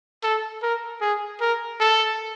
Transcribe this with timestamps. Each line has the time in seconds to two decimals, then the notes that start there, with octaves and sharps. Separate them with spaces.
0.23 A4
0.62 A#4
1.01 G#4
1.41 A#4
1.80 A4